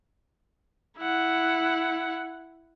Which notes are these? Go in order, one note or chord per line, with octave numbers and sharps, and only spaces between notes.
E4 F#5